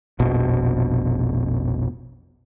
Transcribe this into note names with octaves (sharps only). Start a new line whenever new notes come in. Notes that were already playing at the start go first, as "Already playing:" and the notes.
F1 A#1 B2